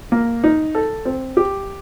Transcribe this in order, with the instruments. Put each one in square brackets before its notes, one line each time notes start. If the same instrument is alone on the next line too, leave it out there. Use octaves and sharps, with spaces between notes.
[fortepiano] A#3
D#4
A4
C4
G4